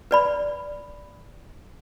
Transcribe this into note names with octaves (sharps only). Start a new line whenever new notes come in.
B4 D5 B5